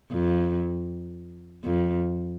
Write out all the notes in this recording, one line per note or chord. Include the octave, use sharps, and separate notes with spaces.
F2
F2